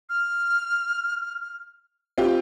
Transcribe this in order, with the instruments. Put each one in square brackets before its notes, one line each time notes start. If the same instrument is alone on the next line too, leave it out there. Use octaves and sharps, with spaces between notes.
[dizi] F6
[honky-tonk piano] C4 F4 G4